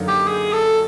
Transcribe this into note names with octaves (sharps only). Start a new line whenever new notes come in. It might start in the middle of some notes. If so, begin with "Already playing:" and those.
Already playing: F#2 D3 F#3 A#3 D#4
G4
G#4
A4